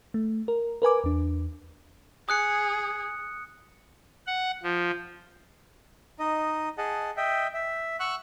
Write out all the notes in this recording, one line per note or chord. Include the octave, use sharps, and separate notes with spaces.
A3
A#4
A#4 B4 G#5 D6
E2 D4
G#4 D#6 F#6 C#7
F#5
F3
D#4 D#5
G#4 D#5 F#5 A5
D#5 E5 G5
E5
F#5 C#6 E6 F#6